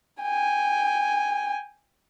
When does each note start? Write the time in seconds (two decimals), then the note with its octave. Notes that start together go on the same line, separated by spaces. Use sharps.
0.22 G5 G#5